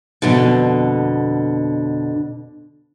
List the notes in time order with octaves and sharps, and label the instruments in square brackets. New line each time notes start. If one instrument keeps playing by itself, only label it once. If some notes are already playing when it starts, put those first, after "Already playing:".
[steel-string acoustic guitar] F2 B2 D3